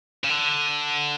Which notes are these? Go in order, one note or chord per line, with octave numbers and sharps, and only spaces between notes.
C#3
D3